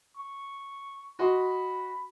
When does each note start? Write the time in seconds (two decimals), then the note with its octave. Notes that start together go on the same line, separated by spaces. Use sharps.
0.17 C#6
1.19 F#4 D#5 B5 C6